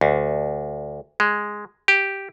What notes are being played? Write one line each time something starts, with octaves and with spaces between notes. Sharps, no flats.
D2
G#3
G4